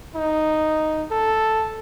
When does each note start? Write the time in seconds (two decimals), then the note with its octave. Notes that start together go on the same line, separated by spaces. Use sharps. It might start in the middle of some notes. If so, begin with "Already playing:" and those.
0.15 D#4
1.11 A4